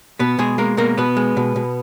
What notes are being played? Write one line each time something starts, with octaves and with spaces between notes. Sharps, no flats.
B2 B3 B4
B2 G#3 G#4
G#3 A#3 A#4
B2 A#3 A#4
B2 B3 B4
G#3
B2
B2